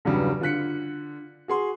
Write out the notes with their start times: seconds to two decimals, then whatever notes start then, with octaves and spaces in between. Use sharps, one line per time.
0.05 E2 G2 C#3 F#3 G3
0.41 D3 F4 F#6 B6 C#7
1.48 F#4 G#4 C6